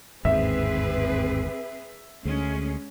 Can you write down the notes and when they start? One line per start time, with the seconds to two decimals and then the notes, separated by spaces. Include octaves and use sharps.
0.25 G1 D#2 G#2 C4 G#4 B4 E5
2.25 D2 G#3 C#4 G#4